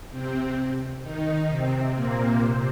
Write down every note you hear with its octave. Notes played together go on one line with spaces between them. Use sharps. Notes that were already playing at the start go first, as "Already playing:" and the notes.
C3 C4
D#3 D#4
C3 C4
A#2 A#3
C3 C4